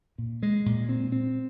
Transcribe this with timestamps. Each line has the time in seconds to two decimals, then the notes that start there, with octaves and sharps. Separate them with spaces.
0.18 A#2
0.43 G#3
0.66 A#2
0.89 C4
1.12 C4